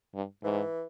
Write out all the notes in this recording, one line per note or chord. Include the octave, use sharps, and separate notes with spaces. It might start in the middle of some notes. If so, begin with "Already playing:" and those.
G2
G#2 E3